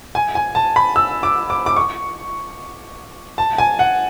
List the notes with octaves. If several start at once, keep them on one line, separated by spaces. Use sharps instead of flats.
G#5
G#5
A5
B5
E6
D6
D6
D6
C#6
A5
G#5
F#5